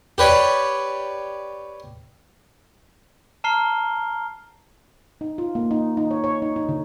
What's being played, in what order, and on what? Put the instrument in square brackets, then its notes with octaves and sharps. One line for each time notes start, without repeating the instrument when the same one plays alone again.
[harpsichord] G4 B4 C#5 D5
[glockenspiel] A5 A#5 F6 C7 G7
[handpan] D#4
F4
A#3
D#4
D#4
C#5
C#5
D#4
D#4
D3